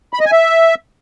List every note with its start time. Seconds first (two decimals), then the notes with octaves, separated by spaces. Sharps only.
0.13 B5
0.20 D#5
0.26 G#5
0.32 E5